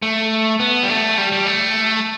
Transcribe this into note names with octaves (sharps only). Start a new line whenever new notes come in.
A3
B3
G3
A3
G3
G3
A3